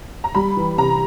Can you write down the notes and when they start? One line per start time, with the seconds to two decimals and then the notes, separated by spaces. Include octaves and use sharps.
0.24 A#5
0.35 G3 B5
0.57 E3
0.78 C3 A#5